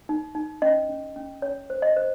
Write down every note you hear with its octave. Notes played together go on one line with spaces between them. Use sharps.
D#4
D#4
C#4 D#5
C#4
C#4
C#4 C#5
C5
D#5
C5